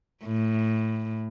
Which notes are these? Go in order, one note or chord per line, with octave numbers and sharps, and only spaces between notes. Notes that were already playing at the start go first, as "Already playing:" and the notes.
A2